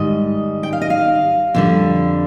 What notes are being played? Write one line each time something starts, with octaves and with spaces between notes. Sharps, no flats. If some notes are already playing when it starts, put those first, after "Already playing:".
Already playing: G#2 D#3 G3 D#5
G5
F5
D#5
F5
F2 D3 G3